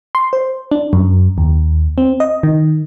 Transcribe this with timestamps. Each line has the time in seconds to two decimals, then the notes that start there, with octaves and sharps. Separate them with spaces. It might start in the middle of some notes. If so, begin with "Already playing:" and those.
0.15 C6
0.33 C5
0.71 D4
0.93 F#2
1.38 D#2
1.98 C4
2.20 D#5
2.43 D#3